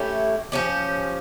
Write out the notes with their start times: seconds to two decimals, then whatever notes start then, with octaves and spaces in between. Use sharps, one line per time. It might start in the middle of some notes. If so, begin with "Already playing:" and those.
Already playing: A3 C#4 E4 G4
0.52 F3 C#4 G4